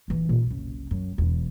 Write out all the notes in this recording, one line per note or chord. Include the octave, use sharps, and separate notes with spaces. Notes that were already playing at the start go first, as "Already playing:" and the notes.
D#1 E3
A#2 D#4
F#1 C2
F#2
E1 E2